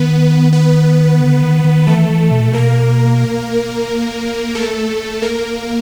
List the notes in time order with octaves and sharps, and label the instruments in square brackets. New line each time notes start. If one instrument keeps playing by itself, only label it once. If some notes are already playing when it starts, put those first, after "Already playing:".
Already playing: [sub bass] D#3 [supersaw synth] B3 B4
[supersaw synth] B3 B4
[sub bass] D3
D#3
D#3
[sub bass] E3 [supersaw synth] A3 A4
[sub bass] E3
B2
A#2
B2
[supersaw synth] A#3 A#4
A3 A4
A#3 A#4